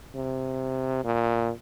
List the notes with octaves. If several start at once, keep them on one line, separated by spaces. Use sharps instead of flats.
C3
A#2